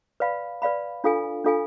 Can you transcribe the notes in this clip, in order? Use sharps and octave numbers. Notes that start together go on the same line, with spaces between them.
B4 D5 F5 B5
B4 D5 F5 B5
D4 F4 A4 F5 G#5
D4 F4 A4 F5 G#5